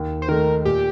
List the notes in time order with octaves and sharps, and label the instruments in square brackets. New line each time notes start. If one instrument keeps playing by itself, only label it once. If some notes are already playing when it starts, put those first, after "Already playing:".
Already playing: [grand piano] D#2
[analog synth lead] C5
[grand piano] D#3 A3 [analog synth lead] A#4
[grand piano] A#2 [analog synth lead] G4